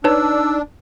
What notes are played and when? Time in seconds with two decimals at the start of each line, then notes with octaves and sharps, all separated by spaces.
0.04 D4 D#4 B4 C#5 A5 E6